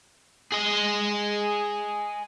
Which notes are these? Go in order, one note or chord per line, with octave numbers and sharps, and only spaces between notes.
G#4 D#5